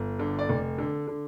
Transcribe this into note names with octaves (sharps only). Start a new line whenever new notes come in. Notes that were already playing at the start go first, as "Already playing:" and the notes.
Already playing: G1
D3
D5
F1
D3
D3